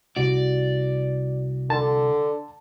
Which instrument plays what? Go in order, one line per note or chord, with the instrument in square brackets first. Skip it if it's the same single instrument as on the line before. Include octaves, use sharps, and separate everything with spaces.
[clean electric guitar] C2 F#4 [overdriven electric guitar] D5
[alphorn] D3 [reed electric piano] A5